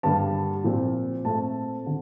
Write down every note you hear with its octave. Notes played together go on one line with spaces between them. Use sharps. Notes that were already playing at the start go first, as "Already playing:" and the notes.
G2 D3 G3 A#3 A5
A#2 F3 C4
A#2 A3 C4 A5
D3